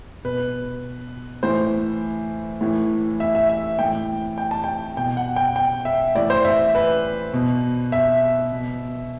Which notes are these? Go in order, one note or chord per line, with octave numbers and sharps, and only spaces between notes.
B2 B4
A2 E3 C5
A2 E3
E5
E5
E5
A2 E3 G5
G5
A5
G5
B2 G5
F#5
G5
G5
E5
A2 E3 D5
C5
E5
B4
B2
E5
B2